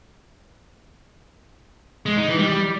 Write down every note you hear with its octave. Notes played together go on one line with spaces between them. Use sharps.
G#3
D#4
E3
G3